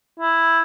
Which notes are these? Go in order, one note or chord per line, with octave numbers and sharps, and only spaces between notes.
E4